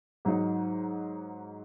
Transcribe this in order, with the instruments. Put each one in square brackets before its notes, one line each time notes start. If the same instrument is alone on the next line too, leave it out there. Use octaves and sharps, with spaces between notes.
[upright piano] G#2 F#3 D#4